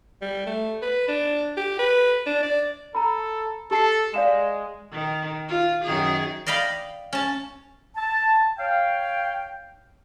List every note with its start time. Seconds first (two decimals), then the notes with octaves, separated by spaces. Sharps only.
0.22 G3
0.47 A3
0.82 B4
1.08 D4
1.57 G4
1.79 B4
2.26 D4
2.43 D5
2.95 A4 A#5 B5
3.71 G4 A4 A5 C7
4.14 G#3 D5 F5 E7
4.92 D#3
5.48 F4
5.85 F#2 D#3 G#4
6.46 D5 D#5 F5 G5 B5
7.13 C#4 A5
7.97 A5
8.59 C#5 F5 G5